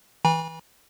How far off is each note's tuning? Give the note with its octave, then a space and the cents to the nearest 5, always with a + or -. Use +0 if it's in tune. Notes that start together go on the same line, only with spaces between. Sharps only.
E3 -20 G#5 -30 B5 -40